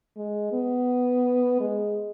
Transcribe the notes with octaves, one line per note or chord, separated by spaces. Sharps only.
G#3
B3
G#3